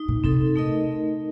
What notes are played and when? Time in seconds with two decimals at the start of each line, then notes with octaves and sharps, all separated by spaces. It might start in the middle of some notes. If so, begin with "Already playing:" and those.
Already playing: D#4
0.08 A#2
0.24 C3 C4 D#4 A4
0.56 A3 D#4 A#4 D#5